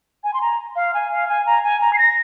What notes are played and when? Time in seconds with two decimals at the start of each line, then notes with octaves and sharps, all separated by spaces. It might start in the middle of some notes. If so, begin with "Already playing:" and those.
0.24 G#5
0.34 C6
0.41 A#5
0.76 F5
0.94 G#5
1.12 F5
1.29 G#5
1.46 A#5
1.63 G#5
1.81 A#5
1.93 C7
1.98 A#6